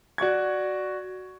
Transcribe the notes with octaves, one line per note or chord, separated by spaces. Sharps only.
F#4 D5 C#6 G#6